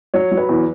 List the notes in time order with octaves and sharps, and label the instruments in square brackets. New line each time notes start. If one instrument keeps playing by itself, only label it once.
[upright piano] F#3 C#5
F#3
B4
E2